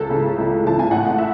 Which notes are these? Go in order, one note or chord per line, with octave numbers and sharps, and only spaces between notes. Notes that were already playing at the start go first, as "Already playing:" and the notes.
Already playing: C#2 A4
C#3 E3
C#2
C#3 E3 A5
G#5
A1 F#5
E5